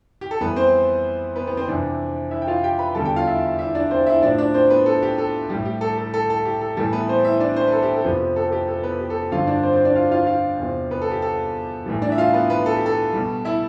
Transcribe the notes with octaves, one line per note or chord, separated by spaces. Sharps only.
G4
A4
F2 E3 G3 B3 B4
C4 C5
B3 B4
B3 B4
C4 C5
F2 C3 E3 D4 D5
E4 E5
G5
F4 F5
G4 G5
B4 B5
E2 D3 G3 A4 A5
G4 G5
F4 F5
E4 E5
E4 E5
D4 D5
C4 C5
E4 E5
A2 F3 D4 D5
D4 D5
C4 C5
B3 B4
A4
G4
A4
A2 G3 G4
G4
A4
A4
A4
A4
G4
A4
A2 E3 G3 A4
B3 B4
C4 C5
E4 E5
D4 D5
C4 C5
B4
A4
G4
A4
F2 C3 F3 B3 B4
G4
A4
A4
G4
A4
B3 B4
G4
A4
G4
G2 D3 F3 F4 F5
D4 D5
C4 C5
C4 C5
D4 D5
F4 F5
F4 F5
F4 F5
E2 C3 F3
B3 B4
A4
G4
A4
A2 E3 G3
D4 D5
E5
F4 F5
B3 B4
B3 B4
A4
G4
A4
B2 G3
E4 E5